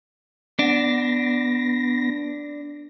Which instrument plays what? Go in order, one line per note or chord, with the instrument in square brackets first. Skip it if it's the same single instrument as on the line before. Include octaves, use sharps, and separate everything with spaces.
[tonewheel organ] B3 A#6 [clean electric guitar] D4